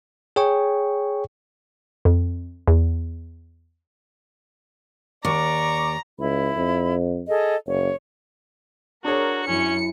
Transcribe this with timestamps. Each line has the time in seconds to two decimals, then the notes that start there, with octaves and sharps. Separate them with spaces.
0.36 G#4 C#5 G5 C#6
2.05 F2
2.68 E2
5.25 D#2 D5 A#5 C#6 D6
6.19 C#2 E4 B5
6.56 F2
7.28 G#4 A4 D#5
7.67 F#1 C#5
9.04 D4 F#4 G#4 A#4 C#5
9.48 F#2 C#4 E4 C#7